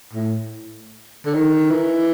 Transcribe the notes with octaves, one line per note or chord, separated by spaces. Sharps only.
A2
D3
D#3
E3